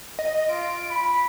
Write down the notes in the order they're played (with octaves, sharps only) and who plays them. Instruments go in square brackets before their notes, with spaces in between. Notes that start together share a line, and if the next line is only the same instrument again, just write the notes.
[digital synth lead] D#5
[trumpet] F4 [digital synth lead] D7
[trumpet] B5